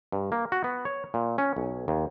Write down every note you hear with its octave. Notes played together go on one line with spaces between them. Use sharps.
G2
A#3
F#4
B3
C#5
A#2
C#4
B1
D#2